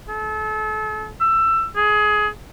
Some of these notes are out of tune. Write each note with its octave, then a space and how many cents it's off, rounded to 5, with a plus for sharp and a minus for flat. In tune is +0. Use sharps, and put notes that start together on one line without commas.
A4 -35
E6 +20
G#4 +20